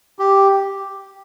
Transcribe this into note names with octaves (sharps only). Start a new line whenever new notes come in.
G4